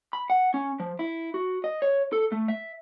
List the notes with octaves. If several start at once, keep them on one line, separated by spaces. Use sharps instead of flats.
B5
F#5
C#4
F3
E4
F#4
D#5
C#5
A4
A3
E5